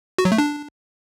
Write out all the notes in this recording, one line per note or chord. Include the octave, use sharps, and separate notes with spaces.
F#4
F#3
A3
D4